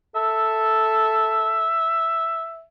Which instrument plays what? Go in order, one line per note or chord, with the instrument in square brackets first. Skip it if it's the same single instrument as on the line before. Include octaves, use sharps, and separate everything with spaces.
[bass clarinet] A4 [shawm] E5